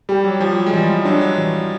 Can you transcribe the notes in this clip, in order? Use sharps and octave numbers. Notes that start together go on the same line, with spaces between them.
G3 G4
F#3
F3 G4
F#3
G#3
E3 G3
G#3
F#3 D4
F#3
E3